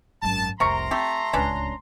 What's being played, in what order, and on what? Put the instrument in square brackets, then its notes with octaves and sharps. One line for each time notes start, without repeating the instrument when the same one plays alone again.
[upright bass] G#1 F#2 [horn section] A5
[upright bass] F1 C2 [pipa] C3 A#4 C#6 [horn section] A#5 C6
[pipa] A3 G4 [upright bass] C4
[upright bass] D1 C#2 [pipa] C#4 D4 B4